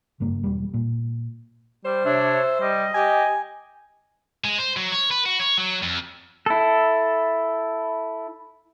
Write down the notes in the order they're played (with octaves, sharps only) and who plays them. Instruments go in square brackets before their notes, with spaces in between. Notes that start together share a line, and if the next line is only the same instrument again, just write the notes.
[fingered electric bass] F#1 G2 A#3
E1 G3
A#2
[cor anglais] G3 [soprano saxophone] C5
[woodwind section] C3 D4 C#5 [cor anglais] E5
[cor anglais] G3 [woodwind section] D#5
[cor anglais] G4 [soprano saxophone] G#5
[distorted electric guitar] G#3
C5
F#3
C#5
B4
F#4
C#5
F#3
F2
[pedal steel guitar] E4 A4